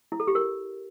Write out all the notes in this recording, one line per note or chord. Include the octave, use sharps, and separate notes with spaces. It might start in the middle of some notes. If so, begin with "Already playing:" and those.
E4
A4
G4
A#4